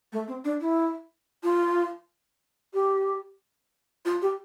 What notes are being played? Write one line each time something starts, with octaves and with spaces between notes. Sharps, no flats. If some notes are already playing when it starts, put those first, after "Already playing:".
A3
C4
D4
E4
F4
G4
F4
G4